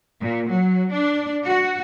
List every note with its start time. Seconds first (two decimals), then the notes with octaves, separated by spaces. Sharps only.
0.21 A#2
0.49 F#3
0.91 D4
1.45 F#4